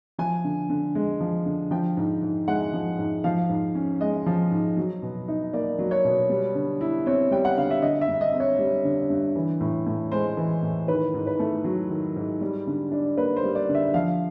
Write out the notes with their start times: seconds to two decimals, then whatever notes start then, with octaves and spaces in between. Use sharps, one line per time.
0.18 F3 G#5
0.44 D3
0.70 D3
0.95 G#3
1.20 F3
1.46 D3
1.71 F3 G5
1.97 G#2
2.22 G#2
2.48 G#3 F#5
2.73 F3
2.99 G#2
3.24 F3 F5
3.49 G#2
3.75 C#4
4.01 G#3 D#5
4.26 F3
4.51 G#2
4.77 F#3
5.03 B2
5.28 D#4
5.53 A#3 D5
5.79 F#3
5.91 C#5
6.05 B2
6.30 G3
6.55 D3
6.81 E4
7.06 C4 C#5
7.31 G3 G5
7.45 F#5
7.57 D3 F5
7.71 E5
7.82 D3 D#5
8.01 E5
8.08 G2
8.21 D#5
8.34 C4
8.40 C#5
8.59 G3
8.84 D3
9.10 G2
9.36 E3
9.60 A2
9.86 A2
10.12 G#3 C5
10.37 E3
10.63 A2
10.88 D#3 B4
11.14 G#2
11.27 B4
11.39 A3
11.65 F#3
11.90 D#3
12.16 G#2
12.41 G3
12.67 D3
12.91 D4
13.17 A#3 B4
13.36 C5
13.43 G3
13.55 D5
13.69 D3
13.75 E5
13.94 F3 F5